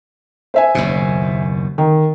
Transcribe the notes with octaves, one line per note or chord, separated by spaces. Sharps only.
C5 E5 G#5
F#1 D#2 B2
D#3